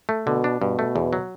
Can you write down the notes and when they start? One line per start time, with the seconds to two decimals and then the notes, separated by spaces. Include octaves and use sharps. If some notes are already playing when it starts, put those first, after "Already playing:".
0.09 A3
0.26 B2 D3
0.44 D4
0.61 G2 B2
0.79 A3
0.96 E2
1.13 F#3